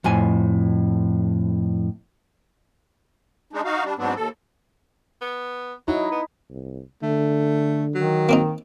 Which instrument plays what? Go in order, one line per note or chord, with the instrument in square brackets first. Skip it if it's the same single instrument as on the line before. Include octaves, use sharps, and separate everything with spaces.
[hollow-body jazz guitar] F2 A2 G#5
[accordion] G#3 D4 D#4
D#4 F#4 F5
G3 D4
G#2 F#3 B3 C4 D4
D#2 A4
[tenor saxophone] B3
[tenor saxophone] F#3 [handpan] D#4 E4
[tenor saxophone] B3
[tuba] C2
[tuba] D3 [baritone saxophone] A3
[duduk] D#3 [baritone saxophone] F#3
[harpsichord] A#3 C4 D#4